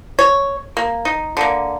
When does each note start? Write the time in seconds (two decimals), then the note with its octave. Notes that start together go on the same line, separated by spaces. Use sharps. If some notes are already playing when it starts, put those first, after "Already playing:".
0.19 C#5
0.77 A#3
1.05 D#4
1.37 D3 A#3